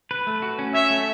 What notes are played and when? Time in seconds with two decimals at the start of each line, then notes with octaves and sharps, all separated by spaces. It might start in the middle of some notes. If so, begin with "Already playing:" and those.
0.11 B4
0.27 A3
0.42 F#4
0.59 C#4
0.74 C#5 E5
0.90 A3